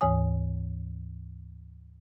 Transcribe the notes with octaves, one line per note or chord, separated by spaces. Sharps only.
D2 G#2 E3 C#5 G#5 D#6